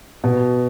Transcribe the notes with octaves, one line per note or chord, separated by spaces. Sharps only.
B2